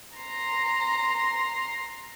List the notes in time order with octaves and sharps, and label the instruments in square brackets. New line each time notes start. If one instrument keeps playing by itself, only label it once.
[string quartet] A#5 C6